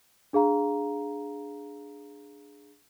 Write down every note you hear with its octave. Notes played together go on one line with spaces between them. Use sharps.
D4 G#4 F5 A#5